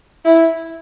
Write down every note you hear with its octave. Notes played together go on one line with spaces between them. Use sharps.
E4